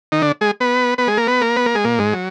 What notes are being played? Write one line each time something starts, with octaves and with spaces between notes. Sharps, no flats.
D#3 D#4
D3 D4
G#3 G#4
B3 B4
B3 B4
G#3 G#4
A#3 A#4
B3 B4
A#3 A#4
B3 B4
A#3 A#4
G#3 G#4
A#2 A#3
G#2 G#3
F#3